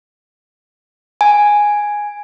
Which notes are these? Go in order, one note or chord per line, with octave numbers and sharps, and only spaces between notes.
G#5